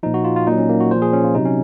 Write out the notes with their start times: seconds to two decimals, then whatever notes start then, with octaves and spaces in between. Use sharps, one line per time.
0.03 A#2 F3 D#4
0.14 F#4
0.24 F4
0.36 F4
0.47 A#2 F#3 D#4
0.58 C#4
0.69 A#3
0.80 F#4
0.91 A#2 F3 C5
1.02 G#4
1.13 C#4
1.24 F4
1.35 C3 F#3 D#4
1.45 C#4